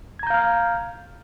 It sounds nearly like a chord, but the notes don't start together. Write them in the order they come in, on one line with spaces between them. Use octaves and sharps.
G#6 A#5 G6 F5 F6